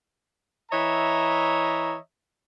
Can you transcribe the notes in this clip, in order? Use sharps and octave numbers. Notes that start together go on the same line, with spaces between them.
E3 C#5 D#5 E5 A#5